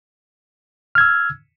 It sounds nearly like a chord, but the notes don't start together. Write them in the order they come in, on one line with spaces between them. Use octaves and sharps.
F6 G#6 E6